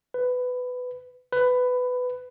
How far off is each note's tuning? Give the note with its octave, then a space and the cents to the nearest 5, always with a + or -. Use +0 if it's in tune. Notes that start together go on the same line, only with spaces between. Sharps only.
B4 +15
B4 +15